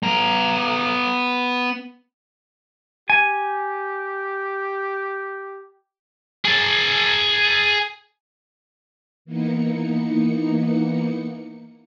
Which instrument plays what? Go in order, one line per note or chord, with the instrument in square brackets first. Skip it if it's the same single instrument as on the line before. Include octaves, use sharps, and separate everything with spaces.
[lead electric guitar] B3 A#5
[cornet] G4 [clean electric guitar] G#5
[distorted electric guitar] G#4 A5
[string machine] E3 A#3 B3 D#4 C#7